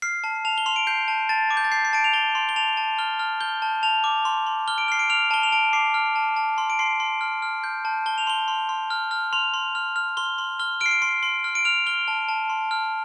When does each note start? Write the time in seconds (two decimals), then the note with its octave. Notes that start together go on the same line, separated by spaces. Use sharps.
0.02 F6 C7
0.24 A5
0.45 A5 F7
0.58 G7
0.66 C6 F7
0.76 D7
0.87 G6 C7
1.08 A5
1.29 A5 A6
1.50 D6
1.57 G6
1.64 A6
1.72 G6 C7
1.85 C7
1.93 A5 D7
2.04 F7
2.13 A5 G7
2.35 C6
2.49 G7
2.56 A5 F7
2.77 A5
2.99 F6 G7
3.19 F6
3.41 G6 G7
3.62 A5
3.83 A5 F7
4.04 D6
4.25 C6
4.47 C6
4.68 F6 G7
4.78 D7
4.88 F6 C7
4.99 D7
5.10 F6 F7
5.31 A5 G7
5.43 F7
5.52 A5 D7
5.73 D6 C7
5.94 F6
6.16 A5
6.36 A5
6.58 C6
6.70 D7
6.79 C6 C7
7.00 C6
7.21 F6
7.42 F6
7.64 G6
7.85 A5
8.06 A5 G7
8.18 F7
8.27 C6 G7
8.48 C6
8.69 C6
8.90 F6
9.11 F6
9.33 C6 F7
9.54 C6
9.75 F6
9.96 F6
10.17 C6 G7
10.38 C6
10.59 F6 G7
10.80 F6 D7
10.86 C7
10.91 D7
11.02 C6 C7
11.23 C6
11.44 F6
11.55 D7
11.65 F6 F7
11.87 F6 G7
12.08 A5
12.29 A5
12.50 C6
12.71 F6